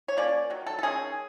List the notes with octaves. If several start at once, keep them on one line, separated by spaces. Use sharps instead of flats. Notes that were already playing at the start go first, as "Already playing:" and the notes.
C#5
F3 A#3 C#4 D5
D#3 F#3
A4
A4
D#3 G#3 C#4 G#4